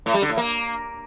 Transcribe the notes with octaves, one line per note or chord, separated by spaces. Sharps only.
A2
G3
D3
A2
A#3